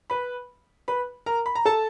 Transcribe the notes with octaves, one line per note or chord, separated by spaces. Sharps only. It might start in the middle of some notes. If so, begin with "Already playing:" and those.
B4 B5
B4 B5
A#4 A#5
B5
A#5
A4 A5